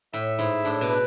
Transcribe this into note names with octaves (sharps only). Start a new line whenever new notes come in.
A2 E5
G#2 E4
A2 D4
B2
B4